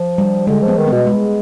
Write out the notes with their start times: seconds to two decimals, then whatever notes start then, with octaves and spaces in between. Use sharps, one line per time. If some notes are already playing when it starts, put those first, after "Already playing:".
Already playing: F3
0.18 G3
0.47 D3 G#3
0.62 F3
0.68 B3
0.77 D#3
0.87 B3
0.92 B2
1.07 G#3